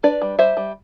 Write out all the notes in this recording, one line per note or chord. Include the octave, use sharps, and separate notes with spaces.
D4 B4 D5
G3
G3 C5 E5
G3